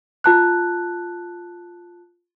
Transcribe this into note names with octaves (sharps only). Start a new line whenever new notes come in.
F4 A5 F#6